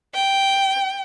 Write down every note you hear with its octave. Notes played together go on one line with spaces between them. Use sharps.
G5